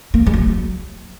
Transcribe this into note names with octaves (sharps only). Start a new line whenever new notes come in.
A#3
G#3
F#3